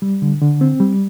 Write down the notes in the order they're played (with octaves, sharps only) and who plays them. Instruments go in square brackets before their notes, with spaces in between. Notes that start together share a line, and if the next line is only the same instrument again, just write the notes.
[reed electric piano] G3
D3
D3
C4
G3